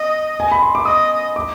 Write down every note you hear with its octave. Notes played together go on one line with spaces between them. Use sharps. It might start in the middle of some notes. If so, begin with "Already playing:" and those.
Already playing: D#5 D#6
G#5
B5
C6
D6
D#5 D#6
D6